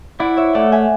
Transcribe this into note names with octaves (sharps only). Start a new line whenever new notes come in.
E4 D5 F#5
C#5 E5
A3 D5 F#5
E5 G#5